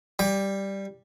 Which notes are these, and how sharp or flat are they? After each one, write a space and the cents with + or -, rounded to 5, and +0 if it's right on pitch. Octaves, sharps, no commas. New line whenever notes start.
G3 +0 G5 +25